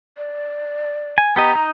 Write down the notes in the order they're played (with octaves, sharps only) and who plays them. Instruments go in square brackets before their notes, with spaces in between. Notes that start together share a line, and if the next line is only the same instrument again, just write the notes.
[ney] D5
[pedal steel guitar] G#5
[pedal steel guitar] B3 G4 D#5 [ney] A#5
[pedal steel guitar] D#4